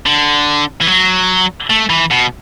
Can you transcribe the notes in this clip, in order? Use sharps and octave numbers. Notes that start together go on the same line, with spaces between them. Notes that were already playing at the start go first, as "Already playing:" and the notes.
D3
E3
F#3
A3
E3
B2